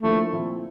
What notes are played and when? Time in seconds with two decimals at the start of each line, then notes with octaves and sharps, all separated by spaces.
0.02 D3 F3 A3 A#3 E4
0.32 A#2 F3 C4 E4